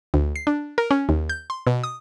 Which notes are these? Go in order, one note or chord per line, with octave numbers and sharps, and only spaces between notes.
D2
C7
D4
A#4
C#4
D#2
G6
C6
B2
D#6